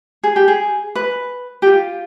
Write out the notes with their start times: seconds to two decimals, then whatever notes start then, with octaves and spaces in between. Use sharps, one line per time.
0.23 G#4
0.36 G4
0.48 G#4
0.95 B4
1.62 G4
1.67 F4